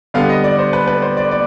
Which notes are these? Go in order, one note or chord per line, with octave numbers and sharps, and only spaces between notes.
D3 G3 B3 F5
D#5
D5
C5
B4
B4
C5
D5
D5